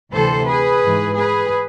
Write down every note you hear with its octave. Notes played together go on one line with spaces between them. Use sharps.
D2 C3 E3 A4 C5
G#4 B4
G#2 E3
G#4 B4